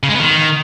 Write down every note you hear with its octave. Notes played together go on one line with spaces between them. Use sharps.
C#3
G#3
B3
D#3